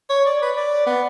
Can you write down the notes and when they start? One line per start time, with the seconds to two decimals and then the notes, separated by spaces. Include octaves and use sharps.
0.10 C#5
0.26 D5
0.42 B4
0.57 D5
0.86 B3